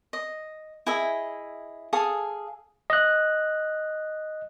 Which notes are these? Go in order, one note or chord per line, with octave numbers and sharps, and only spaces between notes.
D#5
E4 G#4 D#5 E5
G#4 A4 F5 D#6
D#5 F#6